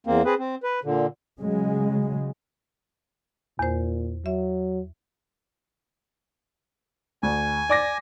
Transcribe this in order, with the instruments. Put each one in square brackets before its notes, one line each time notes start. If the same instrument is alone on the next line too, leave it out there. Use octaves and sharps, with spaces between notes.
[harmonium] E2 A#3 C4
C4 G#4 B4
C4
B4
A#2 D3
[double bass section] C#3 F#3 G#3
[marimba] E2 C5 [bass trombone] A#2
[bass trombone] F#3 [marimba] E5
[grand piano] D2 [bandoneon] G#5
[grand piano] D5 D6 A#6